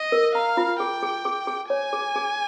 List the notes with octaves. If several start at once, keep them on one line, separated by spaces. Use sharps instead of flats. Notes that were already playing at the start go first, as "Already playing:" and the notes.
Already playing: D#5
A#4
F5 A#5
F4
G#4 G5
G#4
G#4
G#4
C#5 G#5
G#4
G#4